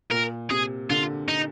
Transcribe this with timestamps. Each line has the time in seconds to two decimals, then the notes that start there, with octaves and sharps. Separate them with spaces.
0.11 A#2 A#4
0.51 C3 G#4
0.90 D3 F4
1.28 D#4